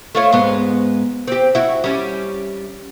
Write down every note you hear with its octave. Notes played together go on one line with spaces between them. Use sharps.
A3 F4 C#5
G#2 G#3 B3
C4 G4
E4 F#4
G3 C#4